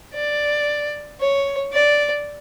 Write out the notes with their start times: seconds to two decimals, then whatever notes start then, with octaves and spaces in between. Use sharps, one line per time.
0.14 D5
1.20 C#5
1.73 D5